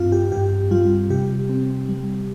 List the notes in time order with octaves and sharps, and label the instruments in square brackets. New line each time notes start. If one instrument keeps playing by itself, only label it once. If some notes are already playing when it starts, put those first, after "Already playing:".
Already playing: [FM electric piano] G2 C4 F4
G4
G2 G4
G3 F4
C3 G4
C4
G3